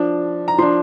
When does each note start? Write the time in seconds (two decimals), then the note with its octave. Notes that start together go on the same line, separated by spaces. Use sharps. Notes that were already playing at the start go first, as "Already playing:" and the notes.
Already playing: F3 D4
0.48 A#5
0.58 F3 D4 C6